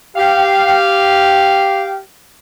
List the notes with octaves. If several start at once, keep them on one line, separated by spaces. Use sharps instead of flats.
G4 F5